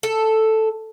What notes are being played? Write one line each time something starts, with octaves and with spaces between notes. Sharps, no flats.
A4